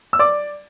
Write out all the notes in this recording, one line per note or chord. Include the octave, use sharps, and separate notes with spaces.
E6
D5 D6